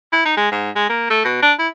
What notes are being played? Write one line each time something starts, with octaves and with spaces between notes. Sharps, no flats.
E4
D#4
G#3
G#2
G#3
A#3
A3
B2
D4
E4